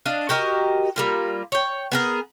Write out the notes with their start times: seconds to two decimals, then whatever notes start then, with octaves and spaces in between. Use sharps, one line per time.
0.05 D4 D#5 F5
0.29 F#4 G4 A#4 D#5
0.96 G3 A#3 F4
1.52 C#5 G5
1.92 B3 G#4 A#4